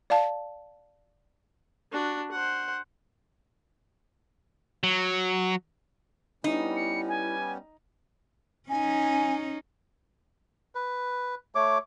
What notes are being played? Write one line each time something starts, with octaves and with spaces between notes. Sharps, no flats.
D5 F5 A5
D4 F#4
C5 F#5
F#3
G3 B3 C#4 D#4 E4
C#7
G#5
C#4 D#4 G#5
B4
A3 C#5 D6